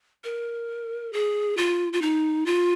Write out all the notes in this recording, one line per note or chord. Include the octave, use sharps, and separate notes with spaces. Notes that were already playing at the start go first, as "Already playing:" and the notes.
A#4
G#4
F4
F4
D#4
F4